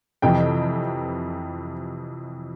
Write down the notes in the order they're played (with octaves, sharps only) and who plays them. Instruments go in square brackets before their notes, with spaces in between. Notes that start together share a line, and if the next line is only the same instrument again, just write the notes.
[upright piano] F2 C3 E3 G5